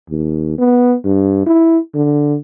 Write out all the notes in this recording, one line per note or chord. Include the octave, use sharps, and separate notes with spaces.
D#2
B3
G2
E4
D3